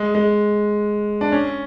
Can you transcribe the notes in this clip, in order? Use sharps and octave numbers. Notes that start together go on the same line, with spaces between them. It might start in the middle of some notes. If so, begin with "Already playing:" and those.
Already playing: G#3
G#3
D4
C#4